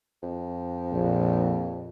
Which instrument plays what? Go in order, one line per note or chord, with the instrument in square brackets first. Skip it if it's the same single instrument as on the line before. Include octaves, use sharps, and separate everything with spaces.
[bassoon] F2
[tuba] A#1